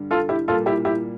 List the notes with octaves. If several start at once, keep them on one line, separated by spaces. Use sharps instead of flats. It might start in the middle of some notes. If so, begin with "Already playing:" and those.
Already playing: G2 D3 G3
F4 A4
E4 G4
A#2 G3 A#3 F4 A4
E4 G4
E4 G4